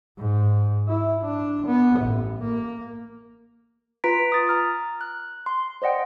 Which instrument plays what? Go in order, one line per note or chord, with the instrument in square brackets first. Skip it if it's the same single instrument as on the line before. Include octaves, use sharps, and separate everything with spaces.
[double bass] G#2
E4
D4
B3
A1
A#3
[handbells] F4 B4 A#5 B6 D7
D#6 A6
A#5 F6
F#6
C6
C5 D5 D#5 F#5 G5